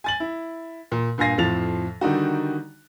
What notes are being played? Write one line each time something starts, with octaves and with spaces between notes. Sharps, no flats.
G#5 A6 F#7
E4
A#2
G2 A#2 F5 G#5 A#6 C7
F2 A2 F3 A6 F7
D3 D#3 G3 D#4 F#4